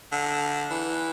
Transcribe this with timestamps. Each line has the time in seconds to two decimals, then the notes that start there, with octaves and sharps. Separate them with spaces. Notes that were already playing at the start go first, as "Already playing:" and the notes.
0.12 D3
0.70 E3